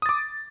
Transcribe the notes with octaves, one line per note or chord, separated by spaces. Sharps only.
D6 D#6 A6